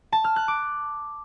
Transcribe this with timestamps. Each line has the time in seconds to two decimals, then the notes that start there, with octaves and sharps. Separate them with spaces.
0.12 A5
0.24 F6
0.36 F#6
0.48 D6